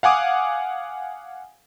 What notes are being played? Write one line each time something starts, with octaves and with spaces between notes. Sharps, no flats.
F5 F#5 G#5 D6 D#6